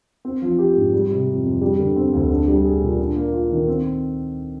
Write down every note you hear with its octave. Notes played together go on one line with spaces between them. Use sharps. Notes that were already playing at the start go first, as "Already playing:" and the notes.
C4
F3
G4
G#2
G3
C3
F2
F2
G3
D3
C4
D2
D4
G3
G#4
A#2
D4
A#3
F4
D#3
C4